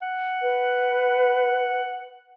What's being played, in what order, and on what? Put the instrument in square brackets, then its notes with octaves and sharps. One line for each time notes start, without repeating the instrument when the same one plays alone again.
[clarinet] F#5
[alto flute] B4